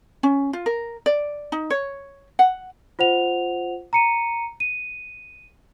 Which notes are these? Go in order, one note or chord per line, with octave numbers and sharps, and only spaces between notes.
C#4
F4
A#4
D5
D#4
C#5
F#5
F4 C5 F#5 F7
A#5 C#7 D#7
D#7